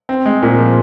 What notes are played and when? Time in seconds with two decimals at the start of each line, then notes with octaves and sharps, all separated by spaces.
0.09 C4
0.25 G#3
0.42 A#2
0.58 F3